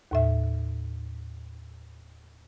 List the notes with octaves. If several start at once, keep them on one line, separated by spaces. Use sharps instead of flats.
D#2 A2 E5